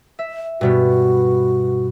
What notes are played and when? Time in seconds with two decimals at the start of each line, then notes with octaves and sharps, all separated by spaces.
0.19 E5
0.61 G2 B2 B3 F#4